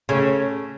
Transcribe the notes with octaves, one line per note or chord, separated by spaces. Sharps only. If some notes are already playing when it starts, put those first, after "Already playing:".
C#3 A3 C#4